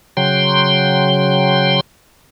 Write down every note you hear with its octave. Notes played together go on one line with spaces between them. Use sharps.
C#3 F#3 G5 C6